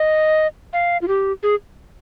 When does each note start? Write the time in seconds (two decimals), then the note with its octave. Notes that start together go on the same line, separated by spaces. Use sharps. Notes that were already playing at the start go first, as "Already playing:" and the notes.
Already playing: D#5
0.73 F5
1.02 F4
1.08 G4
1.43 G#4